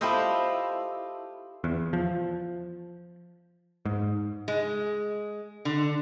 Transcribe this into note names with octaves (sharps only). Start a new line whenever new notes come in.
E4 F4 G4 A4 C5 D#5
E2
F3
G#2
G#3
D3